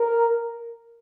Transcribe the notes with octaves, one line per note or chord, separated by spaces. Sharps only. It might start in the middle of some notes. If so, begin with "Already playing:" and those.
Already playing: A#4